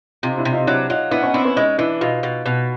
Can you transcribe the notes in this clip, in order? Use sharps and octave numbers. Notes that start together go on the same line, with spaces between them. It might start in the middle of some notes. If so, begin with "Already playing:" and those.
C3 D#4 F4
D4 E4
C3
D#4 F4
F#3 D4 E4
F#3 D#4 F4
B3 D4 E4
C#4 D#4
C4 D4 E4
B3 C#4
G#3 C#4 D#4
E3 D4 E4
B2 D#4 F4
B2
B2